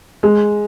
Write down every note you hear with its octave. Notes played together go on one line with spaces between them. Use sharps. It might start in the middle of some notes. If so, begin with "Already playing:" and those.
G#3